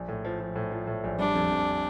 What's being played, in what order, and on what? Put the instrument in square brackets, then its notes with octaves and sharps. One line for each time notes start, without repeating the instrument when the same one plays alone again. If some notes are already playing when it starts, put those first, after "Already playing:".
Already playing: [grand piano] A#1
A2
F3
F3
A2
F3
A2
A#1
[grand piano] G3 [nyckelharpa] D4
[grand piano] F2
F2